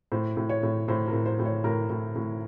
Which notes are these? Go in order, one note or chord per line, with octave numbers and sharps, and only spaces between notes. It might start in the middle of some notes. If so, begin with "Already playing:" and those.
A2 C5
A2
C#5
A2
A2 C5
A#4
A2
C5
A2
C#5
A2 A#4
A2
A2